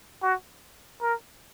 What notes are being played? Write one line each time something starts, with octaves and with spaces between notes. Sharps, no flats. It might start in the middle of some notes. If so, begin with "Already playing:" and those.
F#4
A#4